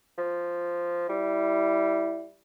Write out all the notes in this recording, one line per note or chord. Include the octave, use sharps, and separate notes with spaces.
F3
G3 E4